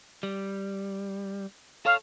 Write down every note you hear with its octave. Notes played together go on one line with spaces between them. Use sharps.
G3
A4 C#5 F5